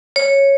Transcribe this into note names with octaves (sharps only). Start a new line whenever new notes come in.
C#5